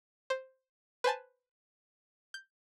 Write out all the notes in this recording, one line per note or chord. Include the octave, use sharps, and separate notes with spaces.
C5
B4 C5 G#5 A5
G6